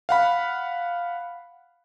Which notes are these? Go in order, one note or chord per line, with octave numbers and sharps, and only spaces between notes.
F5 F#5 B5